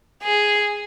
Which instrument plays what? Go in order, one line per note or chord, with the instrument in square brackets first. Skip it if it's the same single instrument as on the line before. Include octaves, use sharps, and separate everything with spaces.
[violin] G#4